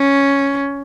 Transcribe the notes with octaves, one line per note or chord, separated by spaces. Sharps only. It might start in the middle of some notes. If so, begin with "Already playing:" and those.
Already playing: C#4